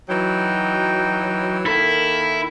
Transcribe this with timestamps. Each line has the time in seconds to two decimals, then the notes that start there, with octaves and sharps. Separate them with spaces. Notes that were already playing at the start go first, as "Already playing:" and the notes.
0.08 E3 F#3 D#4 G5
1.66 D#3 A#3 E4 A4